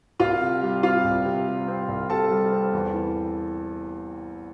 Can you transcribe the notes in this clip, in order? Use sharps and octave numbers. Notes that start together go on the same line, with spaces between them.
C2 F4 F5
C3
G3
C4 F4 F5
C2
C3
G3
C4
C2
C3 A4 A5
G3
C4
E2
E3